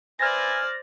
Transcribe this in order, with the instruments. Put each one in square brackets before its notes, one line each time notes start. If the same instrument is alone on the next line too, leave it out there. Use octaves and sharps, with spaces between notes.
[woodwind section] B4 E5 G#5 [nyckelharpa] C5 D5 [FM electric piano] F6 A6 A#6